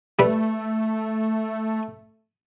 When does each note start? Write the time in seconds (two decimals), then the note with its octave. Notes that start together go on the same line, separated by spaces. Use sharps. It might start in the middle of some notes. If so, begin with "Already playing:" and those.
0.19 G3 A3 B4